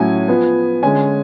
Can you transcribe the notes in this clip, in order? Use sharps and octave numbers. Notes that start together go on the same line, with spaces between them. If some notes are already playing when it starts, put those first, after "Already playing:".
Already playing: A2 F#3 C#4 G#5
F3 B3
D3 G#3 C#4 G#5